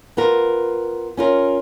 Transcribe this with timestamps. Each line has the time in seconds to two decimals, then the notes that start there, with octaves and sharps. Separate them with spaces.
0.17 B3 F4 A#4
1.17 C#4 F4 A#4